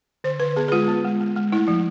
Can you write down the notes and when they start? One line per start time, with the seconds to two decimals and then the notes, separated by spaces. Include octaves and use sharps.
0.24 D3 C5
0.40 D3 B4
0.56 B3 G#4
0.68 G#4
0.72 G#3 F4
0.88 B3
1.04 G#3
1.20 G#3
1.36 G#3
1.52 A3 E4
1.68 F3